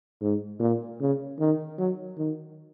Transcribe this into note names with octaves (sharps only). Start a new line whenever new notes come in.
G#2
A#2
C#3
D#3
F#3
D#3